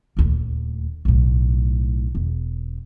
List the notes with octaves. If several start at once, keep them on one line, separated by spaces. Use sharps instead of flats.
D#1 D2
B1 A2
E1